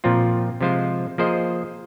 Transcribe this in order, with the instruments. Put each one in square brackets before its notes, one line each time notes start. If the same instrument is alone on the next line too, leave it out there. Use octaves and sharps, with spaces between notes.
[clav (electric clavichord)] A#2 F3 C4 F4
C3 F3 G#3 F4 C5
F3 A#3 G#4 C5 D#5